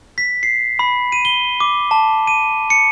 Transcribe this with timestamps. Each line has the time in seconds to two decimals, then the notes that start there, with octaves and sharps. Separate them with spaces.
0.18 B6
0.43 C7
0.79 B5
1.12 D#7
1.25 G7
1.60 D6
1.91 A5
2.27 D#7
2.70 C#7